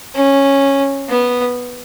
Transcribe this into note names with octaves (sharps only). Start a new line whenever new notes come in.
C#4
B3